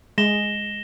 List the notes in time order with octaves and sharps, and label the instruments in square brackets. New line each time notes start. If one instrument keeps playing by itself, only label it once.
[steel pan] G#3 [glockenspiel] A#6 E7 G7